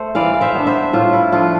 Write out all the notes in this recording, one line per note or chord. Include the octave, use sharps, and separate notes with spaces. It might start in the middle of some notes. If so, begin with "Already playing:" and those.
Already playing: A3 A4 C5
E3 D5 F5
F5
C5 E5
B3 D4
C5 E5
A2 F4
E4
F3 A3 D4 F4